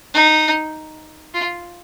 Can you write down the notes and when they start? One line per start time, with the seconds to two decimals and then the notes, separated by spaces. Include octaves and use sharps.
0.14 D#4
1.34 F4